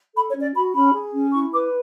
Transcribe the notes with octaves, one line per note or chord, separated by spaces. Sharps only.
A4 B5
C#5
C#4
D5
F#4 B5
C#4 B5
G#4
C#4
E4 C#6
B4 D6